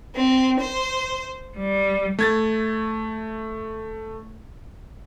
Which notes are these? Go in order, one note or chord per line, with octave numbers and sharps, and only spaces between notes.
C4
C5
G3
A3 G#6 A6